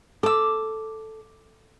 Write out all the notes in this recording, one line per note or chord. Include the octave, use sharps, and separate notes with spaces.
A4 D6 E6